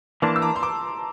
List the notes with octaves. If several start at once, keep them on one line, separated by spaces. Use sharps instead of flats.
E3 A#3 D4 A5 C6
E6
A#5 D6
C6
A#5 D6